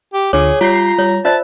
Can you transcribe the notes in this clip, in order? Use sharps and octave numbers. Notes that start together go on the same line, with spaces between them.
G4
D2 D3 F4 G#4 C#5 D6
G3 F4 A#5 G6 C7
G3 C#5
F4 C5 D5 E5 A5